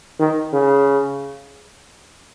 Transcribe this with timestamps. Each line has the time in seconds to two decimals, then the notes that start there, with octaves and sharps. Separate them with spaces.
0.19 D#3
0.53 C#3